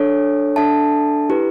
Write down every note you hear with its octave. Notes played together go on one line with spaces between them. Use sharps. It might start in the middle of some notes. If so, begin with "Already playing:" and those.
Already playing: D4 A4 C#5
D4 A4 E5 A5
E4 G4 B4